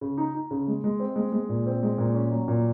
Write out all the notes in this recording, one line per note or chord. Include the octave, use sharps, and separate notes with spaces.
C#3
D#4
D#4
C#3
G#3
G#3
C4
G#3
G#3
A#2
C4
G#3
A#2
C#4
F#3
A#2